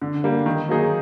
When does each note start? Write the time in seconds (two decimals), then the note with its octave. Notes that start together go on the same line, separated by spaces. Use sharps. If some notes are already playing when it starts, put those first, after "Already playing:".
0.02 D3
0.24 G3 A#3
0.46 D#3
0.68 F#3 A#3 D#4 G#4